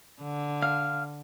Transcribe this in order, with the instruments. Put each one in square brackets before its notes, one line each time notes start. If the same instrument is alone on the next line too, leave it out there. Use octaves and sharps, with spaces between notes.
[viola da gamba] D3
[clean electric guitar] F5